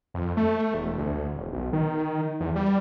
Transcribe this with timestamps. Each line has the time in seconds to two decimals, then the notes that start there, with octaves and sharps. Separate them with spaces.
0.14 F2
0.37 A3
0.74 E1
0.98 D2
1.36 E1
1.53 B1
1.73 D#3
2.40 E2
2.56 G3